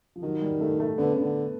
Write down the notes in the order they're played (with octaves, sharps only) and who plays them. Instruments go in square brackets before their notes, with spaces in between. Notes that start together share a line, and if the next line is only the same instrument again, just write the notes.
[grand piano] F3
[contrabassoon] D#3 [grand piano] F#3
[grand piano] G3
A3
A3
[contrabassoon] D3 [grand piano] B3
[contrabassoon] C#3
D3